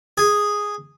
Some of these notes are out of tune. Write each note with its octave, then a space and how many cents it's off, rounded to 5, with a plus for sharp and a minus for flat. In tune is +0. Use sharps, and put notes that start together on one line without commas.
G#4 -5